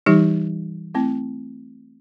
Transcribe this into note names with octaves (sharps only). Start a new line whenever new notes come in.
E3 G3 D#4 G4
A3 C4 E4